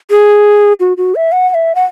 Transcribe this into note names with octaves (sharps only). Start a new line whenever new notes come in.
G#4
F#4
F#4
E5
F#5
F#5
E5
F#5